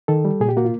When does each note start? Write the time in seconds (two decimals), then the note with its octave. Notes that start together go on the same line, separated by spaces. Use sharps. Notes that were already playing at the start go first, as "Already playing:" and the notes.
0.08 D#3 A4
0.25 G3
0.40 A#2 G#4
0.49 G4
0.57 A#3 F#4
0.65 F4